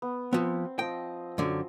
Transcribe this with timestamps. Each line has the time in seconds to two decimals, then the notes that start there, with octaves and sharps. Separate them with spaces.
0.02 B3
0.33 F3 B3 C4
0.79 F3 D#5 G5
1.38 F#2 D3